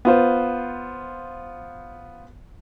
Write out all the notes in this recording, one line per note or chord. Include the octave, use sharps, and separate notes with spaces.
B3 F4 C5